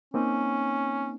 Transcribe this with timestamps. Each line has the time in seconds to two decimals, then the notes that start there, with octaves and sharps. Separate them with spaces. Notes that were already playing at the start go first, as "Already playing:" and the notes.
0.14 A#3 C4 C#4 D#4